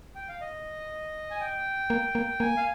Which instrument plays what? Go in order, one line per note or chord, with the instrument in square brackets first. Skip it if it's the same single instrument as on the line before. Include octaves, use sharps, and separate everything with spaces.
[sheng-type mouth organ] G5
F5
D#5
G#5
G5
[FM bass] A#3
A#3
[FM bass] A#3 [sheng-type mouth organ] G#5
[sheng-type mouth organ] F5